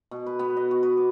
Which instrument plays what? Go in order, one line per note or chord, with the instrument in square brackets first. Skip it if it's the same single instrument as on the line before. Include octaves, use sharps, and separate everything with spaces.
[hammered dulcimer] B2
B4
B3
D#5
F#4
B4
D6